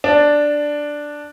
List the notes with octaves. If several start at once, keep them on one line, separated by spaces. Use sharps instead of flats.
D4